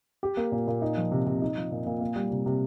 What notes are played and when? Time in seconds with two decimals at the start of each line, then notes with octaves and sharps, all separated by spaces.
0.23 G4
0.37 A#3
0.52 A#2
0.67 A#2
0.82 D#4
0.97 F3
1.12 C3
1.27 C3
1.42 D#4
1.57 F3
1.71 A#2
1.86 A#2
2.01 A#3
2.16 G3
2.31 C3
2.46 C3